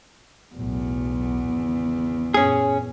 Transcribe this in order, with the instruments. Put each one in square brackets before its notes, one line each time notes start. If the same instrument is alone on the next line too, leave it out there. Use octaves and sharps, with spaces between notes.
[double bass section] B1 A2 F#3 [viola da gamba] E2
[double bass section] G#1 C#3
[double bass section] F#2 A#2 [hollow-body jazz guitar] C#4 G#4